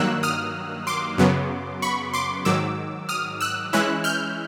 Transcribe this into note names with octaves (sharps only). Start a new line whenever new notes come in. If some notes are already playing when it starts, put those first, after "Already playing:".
Already playing: G2 D#3 F#3 A#3 E6 F#6
D#6 F6
C6 D6
F#2 C#3 F#3 B3
B5 C#6
C6 D6
G#2 D#3 F#3 D6 E6
D#6 F6
E6 F#6
E3 G#3 C#4 E4 E6 F#6
F6 G6